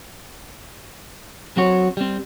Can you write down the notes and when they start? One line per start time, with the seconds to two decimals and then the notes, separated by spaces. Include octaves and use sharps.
1.57 F#3 C4 F#4 C#5
1.97 G3 C4